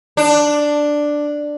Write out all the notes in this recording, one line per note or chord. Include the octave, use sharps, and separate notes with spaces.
D4